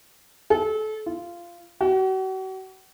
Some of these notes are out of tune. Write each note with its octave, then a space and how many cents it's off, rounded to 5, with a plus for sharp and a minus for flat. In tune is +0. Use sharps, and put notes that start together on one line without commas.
A4 -30
F4 -15
F#4 +40